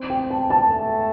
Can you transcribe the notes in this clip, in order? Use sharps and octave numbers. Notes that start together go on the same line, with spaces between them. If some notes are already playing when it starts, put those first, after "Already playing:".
Already playing: C4
G5
A5
A5
A3